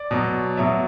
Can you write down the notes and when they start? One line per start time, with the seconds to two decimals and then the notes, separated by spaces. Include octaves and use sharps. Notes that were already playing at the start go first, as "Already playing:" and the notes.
Already playing: D5
0.11 B2 F#3
0.57 B2 F#3 E5